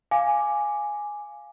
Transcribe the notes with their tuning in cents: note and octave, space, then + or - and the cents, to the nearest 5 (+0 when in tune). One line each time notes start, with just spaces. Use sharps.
F5 +0 G#5 +0 D6 +0